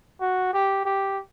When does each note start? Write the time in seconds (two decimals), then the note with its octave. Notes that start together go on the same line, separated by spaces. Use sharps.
0.21 F#4
0.53 G4
0.85 G4